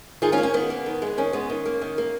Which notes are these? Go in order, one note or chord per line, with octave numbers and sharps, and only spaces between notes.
D#3 F4 G#4
C#4 F4
A#3
C#4
D#3 B3
A#3
D#3
G#3 B3
D#3 C#4
G#3 B3
D#3
A#3
D#3
A#3